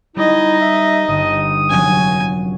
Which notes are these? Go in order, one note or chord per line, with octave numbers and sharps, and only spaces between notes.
G3 D#4 E4 D#5
E5
G1 D#6
F1 F#3 C#4 G#5